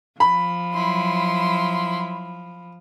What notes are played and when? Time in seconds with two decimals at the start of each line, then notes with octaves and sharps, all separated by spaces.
0.20 F3 B5
0.74 F#3 E4 C6